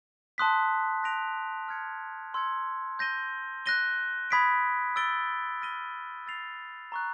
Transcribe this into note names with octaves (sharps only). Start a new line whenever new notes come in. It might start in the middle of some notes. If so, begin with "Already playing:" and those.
A5 C6 D#6 F#6 B6
F#6 A#6 D7 F7
F6 G#6 C#7
C6 E6 G#6 C#7
G6 A#6 D#7 G7
F#6 A#6 D#7 G7
B5 D#6 G#6 B6 D7
E6 A6 D7 G7
F6 A#6 D#7 G7
E6 A6 C7 F7
A#5 C#6 F#6